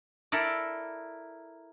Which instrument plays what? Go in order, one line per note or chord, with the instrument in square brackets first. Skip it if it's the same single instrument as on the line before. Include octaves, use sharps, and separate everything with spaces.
[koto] E4 A4 A#4 D5